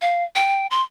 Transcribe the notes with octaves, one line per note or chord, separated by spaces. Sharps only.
F5
G5
C6